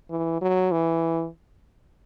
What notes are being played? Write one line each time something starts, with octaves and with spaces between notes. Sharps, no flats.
E3
F#3
E3